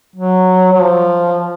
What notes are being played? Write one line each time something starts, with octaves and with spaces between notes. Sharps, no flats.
F#3
F#3
F3